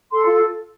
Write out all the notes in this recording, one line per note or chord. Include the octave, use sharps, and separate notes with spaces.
A4 C6
F4